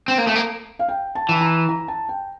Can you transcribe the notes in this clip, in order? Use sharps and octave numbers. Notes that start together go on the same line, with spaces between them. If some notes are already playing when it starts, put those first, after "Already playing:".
C4
A#3
A3
A#3
F5
G5
A5
E3
A#5
A#5
A5
G5